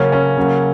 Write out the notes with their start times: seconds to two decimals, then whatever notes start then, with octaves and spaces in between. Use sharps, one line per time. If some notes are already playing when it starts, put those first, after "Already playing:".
Already playing: C#3 F#3 A#3 C#4
0.12 C#4
0.37 C#3 F#3 A#3